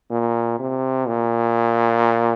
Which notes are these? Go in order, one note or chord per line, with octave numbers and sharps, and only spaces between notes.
A#2
C3
A#2